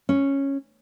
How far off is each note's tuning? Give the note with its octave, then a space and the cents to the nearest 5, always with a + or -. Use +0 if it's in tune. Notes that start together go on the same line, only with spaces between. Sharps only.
C#4 -5